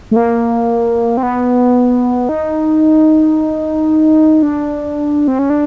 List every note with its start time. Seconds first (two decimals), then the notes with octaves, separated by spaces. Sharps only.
0.11 A3
0.16 A#3
1.17 C4
1.23 B3
2.29 D#4
4.43 D4
5.28 C4
5.39 C#4
5.50 D4